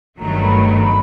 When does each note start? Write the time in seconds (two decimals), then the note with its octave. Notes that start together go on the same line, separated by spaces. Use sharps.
0.19 G1 G2 D#3 F#3 A3 A#5
0.43 B5
0.65 A#5
0.82 B5